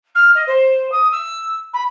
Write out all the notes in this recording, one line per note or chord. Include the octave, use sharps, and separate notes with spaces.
F6
D#5
C5
D#6
E6
B5